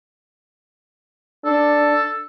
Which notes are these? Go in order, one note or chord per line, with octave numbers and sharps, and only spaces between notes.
D4 A4